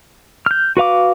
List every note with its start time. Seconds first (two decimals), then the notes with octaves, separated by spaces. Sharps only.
0.46 F6 G6
0.77 F#4 B4 F5 D6